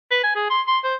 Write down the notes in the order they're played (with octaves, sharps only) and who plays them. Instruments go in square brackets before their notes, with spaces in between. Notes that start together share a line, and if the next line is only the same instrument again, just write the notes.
[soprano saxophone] B4
G#5
G#4
C6
C6
C5